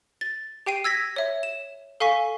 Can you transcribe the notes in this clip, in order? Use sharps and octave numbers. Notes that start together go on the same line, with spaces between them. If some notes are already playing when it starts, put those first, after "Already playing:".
A6
G4 G5 C7 D#7
E6 G#6 A#6 B6
C#5 E5
E7
A4 F5 G#5 C#6 B6